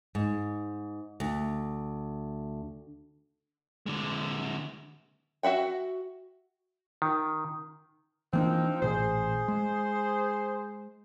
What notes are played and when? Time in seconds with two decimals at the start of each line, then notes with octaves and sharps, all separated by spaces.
0.15 G#2
1.20 D2
3.86 D3 G#3
5.43 F#4 E5 F#5 G5
7.02 D#3
8.33 E3 F3 A#3 C4 D4 D#4
8.82 A1 A#2 G#4 C5
9.48 G#3